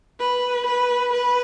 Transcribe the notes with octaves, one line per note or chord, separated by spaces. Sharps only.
B4
B4
B4